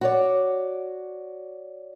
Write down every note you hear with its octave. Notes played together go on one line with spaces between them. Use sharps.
F#4 C#5 D5